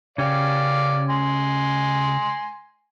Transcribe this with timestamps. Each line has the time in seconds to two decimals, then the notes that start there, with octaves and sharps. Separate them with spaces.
0.18 C#3 C#4 G4 D5 F5
1.10 G#5 C6